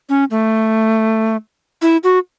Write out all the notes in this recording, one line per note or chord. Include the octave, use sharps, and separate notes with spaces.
C#4
A3
E4
F#4